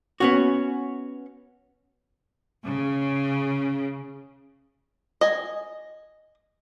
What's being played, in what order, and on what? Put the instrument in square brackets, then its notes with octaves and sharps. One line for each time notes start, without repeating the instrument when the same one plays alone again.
[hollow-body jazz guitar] B3 C#4 F#4
[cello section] C#3
[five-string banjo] D#5 G#5